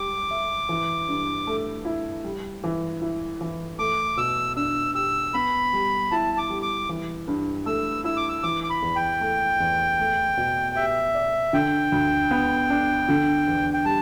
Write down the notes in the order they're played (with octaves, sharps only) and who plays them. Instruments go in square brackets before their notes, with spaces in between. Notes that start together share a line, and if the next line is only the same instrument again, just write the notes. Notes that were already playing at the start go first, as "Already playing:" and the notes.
Already playing: [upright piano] G3 G4 [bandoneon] D6
[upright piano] E5
E3
G2
A3
E4
G3
E3
E4
E3
[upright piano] A3 [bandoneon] D6
[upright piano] B2 [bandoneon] E6
[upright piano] D4 [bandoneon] E6
[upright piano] G4 [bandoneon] E6
[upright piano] B3 [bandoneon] B5
[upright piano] G3
[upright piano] E4 [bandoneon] A5
[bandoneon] D6
[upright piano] G3
[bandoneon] D6
[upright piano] E3
G2
[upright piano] A3 [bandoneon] E6
[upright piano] E4 [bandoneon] E6
[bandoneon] D6
E6
[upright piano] E3 [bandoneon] D6
[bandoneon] D6
B5
[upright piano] E2
[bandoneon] G5
[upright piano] A3
E2
A3
B2
[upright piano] G4 [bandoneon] E5
[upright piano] D5
[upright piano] D3 [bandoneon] G5
[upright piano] D2
B3
D4
D3
E2
[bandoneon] G5
[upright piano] G3 [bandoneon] A5